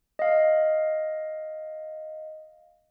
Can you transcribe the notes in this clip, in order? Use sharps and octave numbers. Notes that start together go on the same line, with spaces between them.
D#5 F5